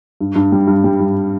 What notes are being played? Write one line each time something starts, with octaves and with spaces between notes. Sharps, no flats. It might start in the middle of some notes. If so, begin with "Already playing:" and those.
G2
G2
G3
G2
G3
G2